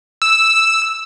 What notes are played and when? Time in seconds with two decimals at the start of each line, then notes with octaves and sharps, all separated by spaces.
0.22 E6